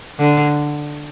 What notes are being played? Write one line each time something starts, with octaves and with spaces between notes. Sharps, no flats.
D3